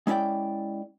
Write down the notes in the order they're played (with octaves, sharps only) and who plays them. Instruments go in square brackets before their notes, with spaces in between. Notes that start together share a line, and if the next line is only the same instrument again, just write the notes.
[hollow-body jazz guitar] G#3 C#4 E4 D5 G5